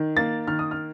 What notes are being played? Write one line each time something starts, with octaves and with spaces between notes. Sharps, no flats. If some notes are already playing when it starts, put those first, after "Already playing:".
Already playing: D#3
A#3 A6
D#3 F6
D#6
F6